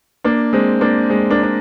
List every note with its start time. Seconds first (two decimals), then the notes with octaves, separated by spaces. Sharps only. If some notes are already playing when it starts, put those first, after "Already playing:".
0.24 A#3 D4
0.53 G#3 C4
0.81 A#3 D4
1.10 G#3 C4
1.30 A#3 D4
1.43 D4